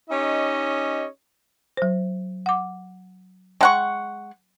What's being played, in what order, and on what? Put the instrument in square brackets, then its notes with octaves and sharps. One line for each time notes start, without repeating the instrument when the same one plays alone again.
[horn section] C#4 D#4 G4 C#5 D#5
[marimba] F#3 C5
F#5 D6
[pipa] G#3 F#5 C#6 [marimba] G5 A5